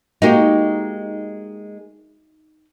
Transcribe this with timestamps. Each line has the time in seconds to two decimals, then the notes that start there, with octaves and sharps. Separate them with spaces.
0.22 G#3 A#3 D#4 F#4 G4